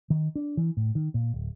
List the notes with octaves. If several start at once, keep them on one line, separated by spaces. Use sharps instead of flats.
D#3
D4
E3
A2
D#3
A#2
D1